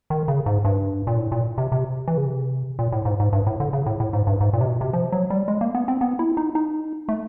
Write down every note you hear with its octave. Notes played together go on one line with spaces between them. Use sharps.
D#3
C#3
G#2
G2
A#2
A2
A#2
C3
C3
E3
C#3
C3
A#2
A2
G#2
G#2
G2
A2
D3
C#3
A2
A2
G#2
G2
G#2
A#2
C3
B2
C3
F3
F#3
G3
G#3
A#3
B3
C4
B3
E4
D#4
D#4
A3